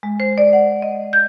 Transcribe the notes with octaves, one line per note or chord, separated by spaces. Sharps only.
G#3
C5
D5
F#5
D#5
G6